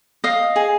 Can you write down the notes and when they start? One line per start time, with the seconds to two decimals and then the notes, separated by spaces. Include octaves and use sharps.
0.24 D#5 F5
0.56 G#4